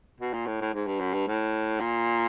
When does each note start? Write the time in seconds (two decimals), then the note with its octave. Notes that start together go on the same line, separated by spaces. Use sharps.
0.20 B2
0.34 A#2
0.47 A2
0.61 A2
0.74 G#2
0.87 G2
1.00 F#2
1.13 G2
1.27 A2
1.80 A#2